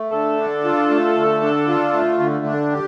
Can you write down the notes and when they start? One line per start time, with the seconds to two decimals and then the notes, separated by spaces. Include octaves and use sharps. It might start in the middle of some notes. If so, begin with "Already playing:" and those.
Already playing: A3
0.12 D3 A4
0.38 D4
0.64 F4
0.90 A3
1.16 D3
1.42 D4
1.68 F4
1.93 A3
2.19 D3
2.46 D4
2.72 G4